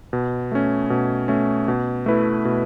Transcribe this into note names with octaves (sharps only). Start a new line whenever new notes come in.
B2
A3 C#4
B2
A3 C#4
B2
A3 E4 B4
B2